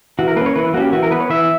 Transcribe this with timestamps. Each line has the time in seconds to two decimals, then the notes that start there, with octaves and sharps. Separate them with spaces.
0.19 E3 F#4
0.28 A#4
0.36 A#3 B4
0.41 C#4
0.46 C#5
0.56 E3 B4
0.74 A#3 F#4
0.77 C#4 G4
0.93 E3 F#4
1.03 A#4
1.11 B3 B4
1.20 C#5
1.30 E3 E5